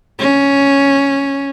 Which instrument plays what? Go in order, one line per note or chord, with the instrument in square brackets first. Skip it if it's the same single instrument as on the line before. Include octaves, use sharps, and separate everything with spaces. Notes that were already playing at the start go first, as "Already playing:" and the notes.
[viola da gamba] C#4